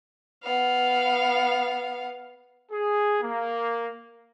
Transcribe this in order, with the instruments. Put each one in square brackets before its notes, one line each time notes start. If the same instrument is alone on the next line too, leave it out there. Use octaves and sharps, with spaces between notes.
[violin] B3 F5
[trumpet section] G#4
A#3